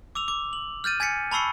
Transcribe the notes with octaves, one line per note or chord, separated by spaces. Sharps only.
D6 E6 F7
D6
F#7
F6 G6 A6 D#7
G#5 G#6 A6 B6 C#7
A5 B5 C#6 E6 C7 C#7